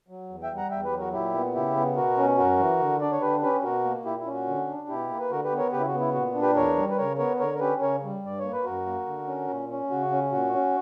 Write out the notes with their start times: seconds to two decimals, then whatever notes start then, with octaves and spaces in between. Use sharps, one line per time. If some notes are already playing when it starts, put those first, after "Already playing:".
0.08 F#3
0.29 E2
0.43 E5 G5
0.50 G3
0.57 F#5 A#5
0.71 E2 E5 G5
0.85 G4 B4
0.92 F#3
0.99 F#4 A#4
1.13 A#2 E4 G4
1.34 B3
1.54 C#3 E4 G4
1.76 B3
1.96 B2 F#4 A#4
2.17 C#4
2.38 F#2 F#4 A#4
2.59 E3
2.79 D3
3.01 D4 D5
3.12 C#5
3.21 D3 G4 B4
3.42 C#4 G4 B4
3.63 B2 F#4 A#4
3.84 A#3
4.05 A#2 E4 G4
4.19 E4
4.26 C#4
4.34 F#4
4.47 D3
4.68 D4
4.88 B2 E4 G4
5.10 A#3
5.19 B4
5.30 D3 F#4 A#4
5.44 G4 B4
5.51 B3
5.58 A#4 C#5
5.72 C#3 G4 B4
5.80 E4
5.86 F#4
5.94 B3
6.00 E4
6.14 A#2 F#4
6.34 D4
6.42 G4 B4
6.55 E2 A#4 C#5
6.76 G3
6.90 B4
6.98 C#3 A#4 C#5
7.18 B3 A#4 C#5
7.39 D3 A#4 C#5
7.54 A#4
7.60 C#4 G4 B4
7.81 C#3 A#4 C#5
8.03 G3
8.24 G2 D5
8.39 A#3 C#5
8.53 B4
8.64 F#2 F#4 A#4
8.86 A#3
9.06 D3
9.27 C#4
9.48 A#2
9.69 C#4
9.90 C#3 F#4
10.11 C#4
10.32 A#2 F#4
10.53 C#4